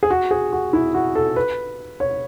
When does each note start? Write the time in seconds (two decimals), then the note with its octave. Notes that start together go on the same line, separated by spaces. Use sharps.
0.03 G#4
0.10 F#4
0.31 G#4
0.52 F#4
0.73 E4
0.94 F#4
1.15 A4
1.36 B4
2.00 C#5